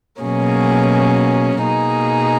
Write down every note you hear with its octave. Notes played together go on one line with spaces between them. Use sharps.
B2 F#3 A#3 C#4 G#4
B2 A#3 D#4 G#4